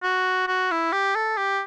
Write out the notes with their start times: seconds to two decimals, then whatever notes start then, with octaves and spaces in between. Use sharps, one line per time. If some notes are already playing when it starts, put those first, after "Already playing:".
0.03 F#4
0.48 F#4
0.71 E4
0.93 G4
1.15 A4
1.38 G4